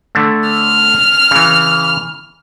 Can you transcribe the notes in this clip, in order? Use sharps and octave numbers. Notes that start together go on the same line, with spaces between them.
D3 A3
F6
C#3 E3